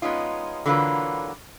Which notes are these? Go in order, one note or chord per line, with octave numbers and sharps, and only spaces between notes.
G#3 B3 C#4 D#4 F4
D3 E3 F#3 A#3 F4 B4